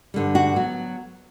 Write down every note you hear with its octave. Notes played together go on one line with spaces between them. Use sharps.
G2 D3 G3
F#4
F#3 B3